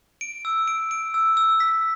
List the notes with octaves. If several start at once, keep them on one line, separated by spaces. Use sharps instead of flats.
D7
E6
D7
D7
E6
E6
B6